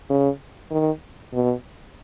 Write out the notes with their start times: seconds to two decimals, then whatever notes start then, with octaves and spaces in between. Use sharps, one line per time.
0.10 C#3
0.71 D#3
1.33 B2